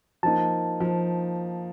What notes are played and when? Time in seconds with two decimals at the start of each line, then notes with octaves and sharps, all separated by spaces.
0.23 F3 A#3 D#4 A5
0.80 F3